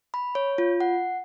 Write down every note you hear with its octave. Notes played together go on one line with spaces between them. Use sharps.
B5
C#5
F4
F#5